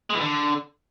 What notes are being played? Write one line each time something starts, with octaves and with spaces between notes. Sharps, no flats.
G#3
E3
D3